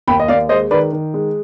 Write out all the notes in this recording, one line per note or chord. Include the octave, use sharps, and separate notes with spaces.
D#2 G5 B5
D#5
D#2 D5 F5
G#3 C5 D#5
D#3 B4 D5
D#3
G#3